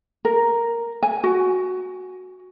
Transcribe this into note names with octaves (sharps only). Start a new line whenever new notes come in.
A#4
G#5
F#4